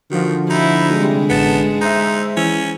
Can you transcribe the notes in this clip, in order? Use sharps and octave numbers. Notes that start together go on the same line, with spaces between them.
D3 D#3 F3 F#4
D#4 E4
C3 G3 G#3
A1 B3 A5 E7
D#4 C5 E5
E3 C#4